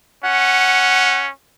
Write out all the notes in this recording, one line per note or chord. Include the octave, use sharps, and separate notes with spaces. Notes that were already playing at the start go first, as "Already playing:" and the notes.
C#4 F#5